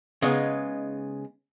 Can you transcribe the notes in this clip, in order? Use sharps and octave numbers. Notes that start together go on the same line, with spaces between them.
C#3 G#3 B3 D#4